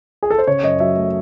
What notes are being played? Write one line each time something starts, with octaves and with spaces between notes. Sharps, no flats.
G#4
A4
C5
C#3 C#5
F#2 D#5
F#3 E5
A3